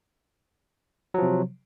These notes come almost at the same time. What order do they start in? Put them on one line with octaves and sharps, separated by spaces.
F#3 F3 C3